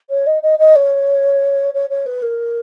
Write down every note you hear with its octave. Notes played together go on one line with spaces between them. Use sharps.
C#5
D#5
D#5
D#5
C#5
C#5
C#5
B4
A#4